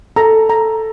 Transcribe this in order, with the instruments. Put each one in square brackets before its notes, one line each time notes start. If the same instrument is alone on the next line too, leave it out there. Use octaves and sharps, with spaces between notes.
[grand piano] A4 [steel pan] A#5
[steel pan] A#5